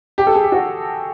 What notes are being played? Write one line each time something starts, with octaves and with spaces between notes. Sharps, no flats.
G4
A4
G#4
G4
F#4